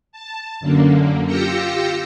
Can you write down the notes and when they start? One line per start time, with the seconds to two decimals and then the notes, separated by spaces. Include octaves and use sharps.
0.12 A5
0.60 F#2 D3 A#3
1.27 F4 G4 E6 G6 A#6 C#7